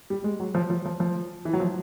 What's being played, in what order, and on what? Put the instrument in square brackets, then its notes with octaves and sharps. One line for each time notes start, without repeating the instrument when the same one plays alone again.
[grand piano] G3
G#3
F#3
F3
F3
F3
F3
E3
F#3
F3